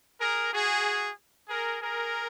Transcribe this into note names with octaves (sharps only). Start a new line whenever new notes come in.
G#4 A#4
F#4 G#4
G#4 A#4
G#4 A#4